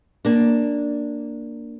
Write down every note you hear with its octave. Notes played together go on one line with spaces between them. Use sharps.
A#3 D4